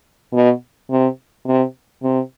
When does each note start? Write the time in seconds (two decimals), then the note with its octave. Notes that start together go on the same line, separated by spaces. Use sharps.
0.34 B2
0.90 C3
1.46 C3
2.03 C3